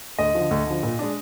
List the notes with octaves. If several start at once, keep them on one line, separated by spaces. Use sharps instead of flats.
D2 D#5
D3 F3
D2
D3 F3
A#2
G#3 D4